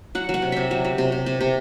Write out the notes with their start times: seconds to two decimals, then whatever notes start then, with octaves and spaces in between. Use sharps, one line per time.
0.15 F#3 F#5
0.29 F#3
0.34 F#5
0.42 C3
0.52 C3 E5
0.71 F#3
0.85 F#3
0.98 C3
1.12 C3
1.26 C3
1.41 C3